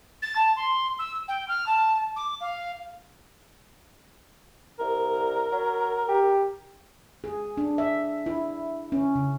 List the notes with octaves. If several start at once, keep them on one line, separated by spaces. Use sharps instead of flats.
A6
A5
C6
E6
G5
F6
A5
D6
F5
C2 A#4
F#3
G4
G#4
D4
E5
E4
C#4
C#3